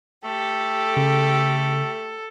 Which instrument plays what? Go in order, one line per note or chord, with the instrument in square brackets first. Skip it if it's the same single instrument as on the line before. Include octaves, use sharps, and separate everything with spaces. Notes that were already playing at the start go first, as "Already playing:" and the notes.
[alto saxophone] A3 [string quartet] G4 [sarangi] A4
[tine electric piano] C#3